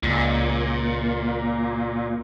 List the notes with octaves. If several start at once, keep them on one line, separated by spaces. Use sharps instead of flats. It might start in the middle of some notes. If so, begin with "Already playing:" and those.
C#2 A#2